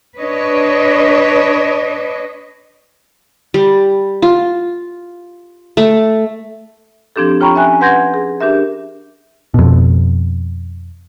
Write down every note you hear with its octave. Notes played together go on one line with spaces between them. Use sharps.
D4 B4 C#5 D#5
G3
F4
A3
F3 C4 D4 G4 A4
F4 C#5 G5 A#5 B5 C#6
C#4 E5 G5 G#5 F#6
B4 F#5 C6 G6 G#6 A#6
G#4
D4 G4 A#4 E5
F2 B2